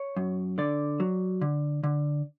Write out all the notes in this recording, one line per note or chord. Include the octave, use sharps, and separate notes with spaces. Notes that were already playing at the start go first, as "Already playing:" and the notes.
Already playing: C#5
F#2
D3 D5
F#3
D3
D3